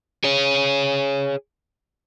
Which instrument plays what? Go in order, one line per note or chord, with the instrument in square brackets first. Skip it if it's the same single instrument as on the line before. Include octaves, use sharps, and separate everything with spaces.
[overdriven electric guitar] G#4 C#5